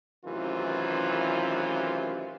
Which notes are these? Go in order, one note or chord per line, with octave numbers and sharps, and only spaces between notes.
A1 F#2 C3 D#3 E3 F4